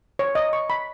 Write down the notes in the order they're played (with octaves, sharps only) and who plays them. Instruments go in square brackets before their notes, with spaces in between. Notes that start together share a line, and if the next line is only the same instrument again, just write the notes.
[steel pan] C#5
D#5
C#6
B5